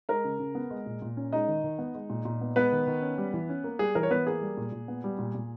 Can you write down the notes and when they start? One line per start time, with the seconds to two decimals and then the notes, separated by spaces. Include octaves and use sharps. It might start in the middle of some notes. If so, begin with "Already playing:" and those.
0.09 G#3 A#4 A#5
0.24 C#3
0.39 C#3
0.55 B3
0.70 G#3
0.86 A#2
1.02 A#2
1.17 C#4
1.32 G#3 D#4 D#5
1.48 D#3
1.64 D#3
1.79 B3
1.95 G#3
2.10 A#2
2.25 A#2
2.41 B3
2.56 G#3 B3 B4
2.72 D#3
2.87 D#3
3.02 C#4
3.18 G3
3.33 E3
3.49 C#4
3.64 A#3
3.79 G3 G#4
3.95 E3 A#4
4.03 C#5
4.11 E3 B3 B4
4.27 A#3 G#4
4.41 G3
4.57 A#2
4.72 A#2
4.88 B3
5.04 G3
5.19 A#2
5.35 A#2